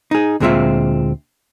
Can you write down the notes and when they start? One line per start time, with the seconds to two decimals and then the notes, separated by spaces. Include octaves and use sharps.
0.11 D#4 G#4
0.40 D2 A#2 G#3 C4 F4 E5